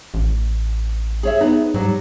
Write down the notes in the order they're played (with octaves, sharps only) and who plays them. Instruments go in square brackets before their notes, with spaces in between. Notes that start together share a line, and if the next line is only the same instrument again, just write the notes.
[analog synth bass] A1
[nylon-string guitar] G#4 C#5 E5
[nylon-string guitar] B3 G#4 [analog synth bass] D#4
[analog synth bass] G#2 [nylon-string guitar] F#3 G3